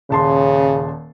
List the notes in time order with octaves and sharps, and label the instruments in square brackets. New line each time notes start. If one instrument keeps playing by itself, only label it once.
[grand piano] D#1 A5 C6 [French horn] C#3